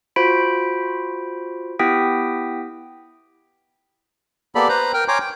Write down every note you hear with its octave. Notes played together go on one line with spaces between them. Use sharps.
F4 F#4 C5 B5 B6 D7
B3 E4 G4 G5 D#6 B6
A#3 B3 G4 A4 D5 B5
B4 C5 A#5
A#4 G5
C#5 G5 G#5 A#5 C6 D6
G5